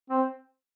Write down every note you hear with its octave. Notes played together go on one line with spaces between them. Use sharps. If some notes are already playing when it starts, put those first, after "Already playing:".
C4